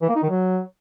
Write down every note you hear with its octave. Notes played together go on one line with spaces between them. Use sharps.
E3
A#3
D#4
D#3
F#3